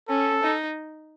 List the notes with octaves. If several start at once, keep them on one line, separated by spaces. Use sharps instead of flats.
C#4 A4
D#4